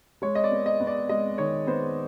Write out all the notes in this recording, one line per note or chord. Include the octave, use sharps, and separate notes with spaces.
G#3 C#5
D#5
D5
B3
D#5
B3
D5
G#3 D#5
D#3 C#5
B3 C5